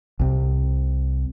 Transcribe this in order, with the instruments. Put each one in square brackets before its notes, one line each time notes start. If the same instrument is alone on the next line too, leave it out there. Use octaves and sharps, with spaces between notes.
[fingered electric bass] C2 C3